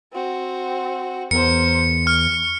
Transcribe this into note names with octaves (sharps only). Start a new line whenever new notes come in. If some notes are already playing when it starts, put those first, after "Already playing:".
C4 F#4
E2 A#4 C5 C#7
C#6 F6